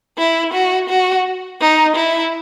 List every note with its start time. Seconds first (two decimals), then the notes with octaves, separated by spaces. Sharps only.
0.18 E4
0.53 F#4
0.89 F#4
1.61 D#4
1.96 E4